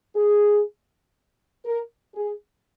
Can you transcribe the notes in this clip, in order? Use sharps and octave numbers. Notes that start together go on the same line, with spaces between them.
G#4
A#4
G#4